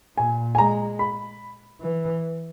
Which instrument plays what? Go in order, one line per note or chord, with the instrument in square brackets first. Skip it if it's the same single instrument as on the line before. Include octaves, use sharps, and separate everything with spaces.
[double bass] A#2 [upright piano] G#5
[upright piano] G#5
[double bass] G#3 [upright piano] A#5
[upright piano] B5
[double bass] E3